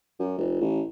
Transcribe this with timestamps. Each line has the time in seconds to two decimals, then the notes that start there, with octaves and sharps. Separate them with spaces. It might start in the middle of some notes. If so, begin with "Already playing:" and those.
0.19 F#2
0.38 F1
0.61 A1